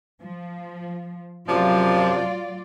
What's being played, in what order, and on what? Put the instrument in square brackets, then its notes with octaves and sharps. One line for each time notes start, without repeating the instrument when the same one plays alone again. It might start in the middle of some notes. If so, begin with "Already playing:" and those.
[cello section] F3
[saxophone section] F#2 C3 F3 [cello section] F#3 F4 D5